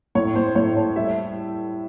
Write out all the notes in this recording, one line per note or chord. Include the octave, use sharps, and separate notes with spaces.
A2 C#5
A2 C5
A2 C#5
A3 C#5
G3 E5